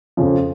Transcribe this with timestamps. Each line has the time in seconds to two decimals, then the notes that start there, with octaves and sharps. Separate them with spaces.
0.17 F2 C#3 F3